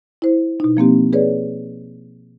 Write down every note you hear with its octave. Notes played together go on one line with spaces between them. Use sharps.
E4 C5
B2 D#4
F3 A#3 C4 G4
G#4 B4 C#5 D5